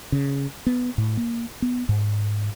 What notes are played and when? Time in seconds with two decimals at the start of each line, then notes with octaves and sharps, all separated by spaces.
0.12 C#3
0.67 B3
0.98 A2
1.17 A#3
1.62 B3
1.89 G#2